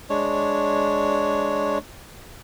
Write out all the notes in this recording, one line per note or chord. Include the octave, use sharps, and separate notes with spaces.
G#3 D4 C#5